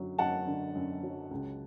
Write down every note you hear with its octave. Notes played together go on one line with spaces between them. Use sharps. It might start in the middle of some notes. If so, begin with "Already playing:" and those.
Already playing: F#2 D3 F#3
F#2 F#5 A5
D3
F#2
F#3
C#2